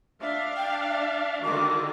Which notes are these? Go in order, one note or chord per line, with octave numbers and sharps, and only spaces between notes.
D4 E5 F5
G5
E5
D3 D#3 F#4 D6